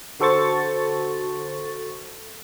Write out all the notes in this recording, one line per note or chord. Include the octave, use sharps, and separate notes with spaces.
D3 F#4 A4 C5 C#6 A6